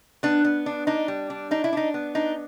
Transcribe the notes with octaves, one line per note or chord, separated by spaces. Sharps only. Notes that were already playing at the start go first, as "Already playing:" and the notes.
B3 D4
B3
D4
D4 D#4
G3
D4
D4 D#4
E4
D4 D#4
B3
D4 D#4